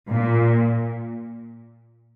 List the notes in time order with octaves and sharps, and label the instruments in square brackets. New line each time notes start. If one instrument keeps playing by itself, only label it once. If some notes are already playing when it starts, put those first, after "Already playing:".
[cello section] A#2